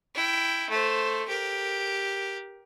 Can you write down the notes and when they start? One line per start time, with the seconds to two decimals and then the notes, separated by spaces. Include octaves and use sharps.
0.15 E4 G5
0.70 A3 C5
1.29 G4 A#4